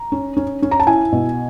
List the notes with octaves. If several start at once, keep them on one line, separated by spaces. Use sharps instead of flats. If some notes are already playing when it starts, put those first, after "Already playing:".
Already playing: A#5
C#4
C#4
C#4
A#5
A5
E4 G#5
B2